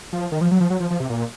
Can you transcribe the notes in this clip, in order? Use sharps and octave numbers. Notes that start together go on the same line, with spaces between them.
F3
D#3
F3
F#3
F3
F#3
F3
F3
C3
A#2